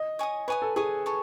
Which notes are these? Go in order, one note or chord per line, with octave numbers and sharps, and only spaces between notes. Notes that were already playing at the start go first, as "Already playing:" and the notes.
Already playing: D#5
C#5 G#5 D#6
B4 C#5 G#5 D#6
A4
G#4 C#5 G#5 D#6
A4 C#5 G#5 C#6